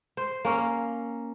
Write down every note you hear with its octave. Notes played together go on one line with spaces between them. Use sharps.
C5
A#3 C#4